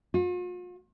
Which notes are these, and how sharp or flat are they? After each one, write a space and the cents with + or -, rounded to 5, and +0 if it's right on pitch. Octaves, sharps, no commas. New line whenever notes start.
F4 +45